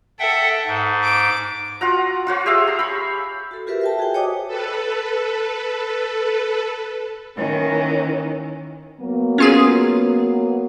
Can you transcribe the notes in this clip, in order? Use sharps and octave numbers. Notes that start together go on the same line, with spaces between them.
A4 E5 F#5 G5
G#2
D6
F4 F#4 F#5 A#5
F4 F#4 C#5
G4 G#4 E5 F5
A#5
B5 C#6
F#4 A4
F4 G4 A#4 B4 E5
E5 G5 A5
F#4 G#4 C5 G5 G#5
G4 C#5 D#5 G5 D6 D#6
A4 B4
D#3 E3 A#3 C#4
F#3 A#3 B3
C#4 F4 G#4